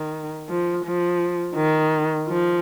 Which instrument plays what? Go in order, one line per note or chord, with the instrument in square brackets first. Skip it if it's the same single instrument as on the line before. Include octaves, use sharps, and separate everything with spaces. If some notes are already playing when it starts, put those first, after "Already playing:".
Already playing: [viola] D#3
F3
F3
D#3
F3